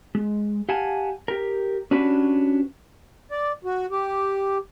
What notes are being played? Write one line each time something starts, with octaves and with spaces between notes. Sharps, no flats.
G#3
G4 F5 F#5 G#5 A5
G4 A#4
C#4 D4 F#4 G4 B4 C#5
D5
F#4
G4